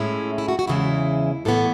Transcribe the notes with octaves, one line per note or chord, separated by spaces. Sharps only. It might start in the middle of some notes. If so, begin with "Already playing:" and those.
Already playing: A2 G#3 C#4 E4
E4
F#4
F#4
E2 C#3 E3 G#3 E4
A2 E3 B3 A4